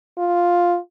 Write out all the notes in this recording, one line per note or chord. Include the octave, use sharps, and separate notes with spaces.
F4